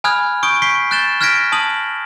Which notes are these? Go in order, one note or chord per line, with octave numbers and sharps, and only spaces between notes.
G#5 B5 D#6 F6 F#6 G#6
C#6 D#6 G6 D7
C#6 G6 B6 C7 D7
F#6 G6 A6 E7 G7
F6 F#6 G#6 A#6 B6 D7
A5 D#6 F#7